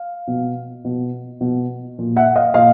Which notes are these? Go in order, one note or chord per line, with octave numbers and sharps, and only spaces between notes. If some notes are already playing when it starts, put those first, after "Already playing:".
Already playing: F5
B2
B2
B2
A#2
E5 F#5
D#5 F5
A#2 D#5 F5